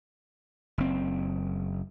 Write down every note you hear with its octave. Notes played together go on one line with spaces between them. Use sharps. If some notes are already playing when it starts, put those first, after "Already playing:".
F#1 C4